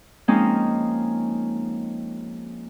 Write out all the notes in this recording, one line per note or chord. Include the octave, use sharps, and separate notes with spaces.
F3 G#3 A#3 C4 C#4 D#4